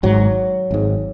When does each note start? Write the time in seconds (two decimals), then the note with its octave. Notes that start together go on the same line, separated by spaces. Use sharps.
0.03 G#1 G#2 F#3
0.71 G#1 G#2